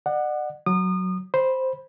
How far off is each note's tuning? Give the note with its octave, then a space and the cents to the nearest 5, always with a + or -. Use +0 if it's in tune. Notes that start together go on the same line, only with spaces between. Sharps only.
D5 +40 F#5 +0
F#3 +0 D#6 -30
C5 +0 B5 -10